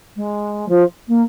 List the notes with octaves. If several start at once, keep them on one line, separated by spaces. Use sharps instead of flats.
G#3
F3
A#3